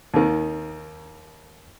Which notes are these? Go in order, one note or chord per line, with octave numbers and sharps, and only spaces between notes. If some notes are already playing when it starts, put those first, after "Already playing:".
D#2 D#3